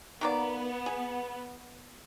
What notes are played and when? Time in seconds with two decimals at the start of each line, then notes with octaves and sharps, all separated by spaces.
0.21 D#3 A#3 B3 D5
0.86 G#4